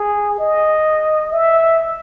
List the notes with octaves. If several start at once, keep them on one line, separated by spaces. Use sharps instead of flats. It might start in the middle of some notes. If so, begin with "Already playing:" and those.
Already playing: G#4
D#5
E5